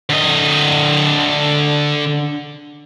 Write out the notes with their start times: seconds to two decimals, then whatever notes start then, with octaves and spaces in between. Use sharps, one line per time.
0.09 D3 D#5